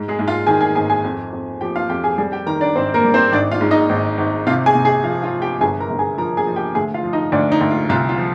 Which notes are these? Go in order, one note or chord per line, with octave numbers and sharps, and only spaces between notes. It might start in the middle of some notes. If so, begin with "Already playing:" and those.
Already playing: G#2
G#3 G#4
G#2
F4 F5
D#3 G#4 G#5
G#4 G#5
G#1 G#4 G#5
G#4 G#5
F2
F2
F3 G4 G5
F4 F5
F2 G4 G5
G#4 G#5
G3 G#4 G#5
G4 G5
D#3 A#4 A#5
D4 D5
G#1 C4 C5
A#3 A#4
G3
C4 C5
G#1 D4 D5
F4 F5
G#2
D#4 D#5
G#1
G#1
C3 F4 F5
G#4 G#5
C3
G#4 G#5
F3 F4 F5
F4 F5
F3
G4 G5
G1 G#4 G#5
A#4 A#5
G1
G#4 G#5
F3 A#4 A#5
G#4 G#5
F3
G4 G5
D2 G#4 G#5
F4 F5
F3
D#4 D#5
D2 D4 D5
D#4
D2
F4
C2 F4
F4
F3